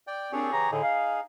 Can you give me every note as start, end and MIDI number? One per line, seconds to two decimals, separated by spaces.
0.07 0.32 74
0.07 0.32 79
0.32 0.49 46
0.32 0.49 60
0.32 0.49 62
0.32 0.71 67
0.32 0.71 68
0.32 0.71 73
0.53 0.69 49
0.53 0.69 52
0.53 0.69 82
0.71 0.82 45
0.71 0.82 50
0.71 1.20 63
0.71 1.20 68
0.83 1.20 77